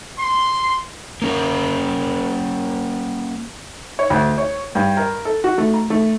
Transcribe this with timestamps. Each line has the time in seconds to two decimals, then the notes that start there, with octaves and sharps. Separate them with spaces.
0.18 C6
1.22 A#3 C#4 A#4
3.99 C#5
4.10 D2
4.38 C#5
4.75 G2
4.97 A#4
5.25 A4
5.44 F#4
5.58 A3
5.74 A#5
5.90 A3